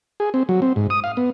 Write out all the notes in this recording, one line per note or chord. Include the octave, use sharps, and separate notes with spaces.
G#4
C4
F#3
C4
G#2
D#6
F5
B3